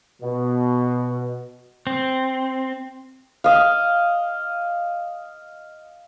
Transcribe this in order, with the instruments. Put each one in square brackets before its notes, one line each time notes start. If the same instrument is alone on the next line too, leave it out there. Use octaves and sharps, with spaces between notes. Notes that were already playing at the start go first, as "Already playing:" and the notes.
[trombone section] B2
[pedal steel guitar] C4
[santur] D#5 F5